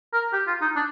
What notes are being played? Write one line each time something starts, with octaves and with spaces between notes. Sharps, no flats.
A#4
G4
F4
D#4
D4